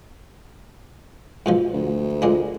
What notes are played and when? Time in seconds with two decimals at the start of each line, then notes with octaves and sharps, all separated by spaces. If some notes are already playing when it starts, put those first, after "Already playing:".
1.46 G#2 B2 F3
1.73 D2
2.22 A#2 G#3 D4